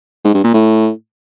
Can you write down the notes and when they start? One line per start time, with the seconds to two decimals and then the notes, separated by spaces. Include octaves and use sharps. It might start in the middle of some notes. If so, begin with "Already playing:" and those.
0.25 G#2
0.34 G2
0.44 A#2
0.54 A2